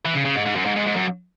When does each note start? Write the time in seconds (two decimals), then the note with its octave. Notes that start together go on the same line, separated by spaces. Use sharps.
0.05 E3
0.15 C#3
0.25 C#3
0.36 G#2
0.46 G#2
0.56 F#2
0.66 G#2
0.76 G#2
0.87 G#2
0.96 F#2